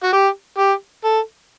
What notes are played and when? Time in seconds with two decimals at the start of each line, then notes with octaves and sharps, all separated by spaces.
0.03 F#4
0.13 G4
0.58 G4
1.04 A4